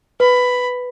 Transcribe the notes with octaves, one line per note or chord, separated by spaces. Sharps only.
B4 B5